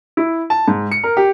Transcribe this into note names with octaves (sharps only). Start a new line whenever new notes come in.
E4
A5
G#2
C#7
A#4
G4